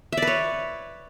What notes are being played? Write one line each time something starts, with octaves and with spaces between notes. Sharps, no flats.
B4 C#5 D5 E5